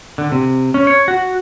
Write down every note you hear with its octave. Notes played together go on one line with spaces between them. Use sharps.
D3
C3
C#4
C#5
F#4